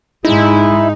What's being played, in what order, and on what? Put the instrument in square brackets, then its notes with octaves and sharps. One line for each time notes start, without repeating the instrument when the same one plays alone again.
[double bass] G#2 G#3 [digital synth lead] D#4 [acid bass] E4